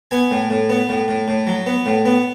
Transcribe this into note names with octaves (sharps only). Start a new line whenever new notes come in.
B3 G#5
A2
A2
B3
A2
A2
A2
F#3
B3
A2
B3